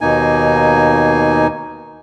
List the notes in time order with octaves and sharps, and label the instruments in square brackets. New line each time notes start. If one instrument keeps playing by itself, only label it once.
[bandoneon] D#2 B2 A#3 D#4 G#5